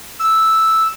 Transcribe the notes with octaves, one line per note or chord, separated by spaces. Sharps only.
E6